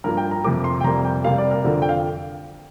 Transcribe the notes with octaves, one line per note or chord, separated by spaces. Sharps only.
G2 F3 A#3 A#4
G5
A#5
F2 C3 A#3 D6
C6
G5
F2 C3 G3 A#3 A#5
G5
C3 G3 A#3 F5
D5
A#4
F2 D3 F3 A#3
G5
F5